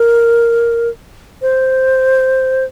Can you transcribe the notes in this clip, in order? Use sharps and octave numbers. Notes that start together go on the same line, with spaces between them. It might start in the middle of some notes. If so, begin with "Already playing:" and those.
Already playing: A#4
C5